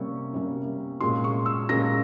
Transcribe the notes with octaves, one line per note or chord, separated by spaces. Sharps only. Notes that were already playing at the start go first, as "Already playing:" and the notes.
Already playing: C3 G3 A#3 C#4 C#6
C3 G3 A#3 C#4
A#2 G#3 C#4 C6
C#6
E6
A#2 G#3 C#4 A#6